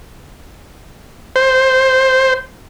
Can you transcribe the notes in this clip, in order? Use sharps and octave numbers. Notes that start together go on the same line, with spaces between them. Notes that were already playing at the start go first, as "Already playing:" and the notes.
C5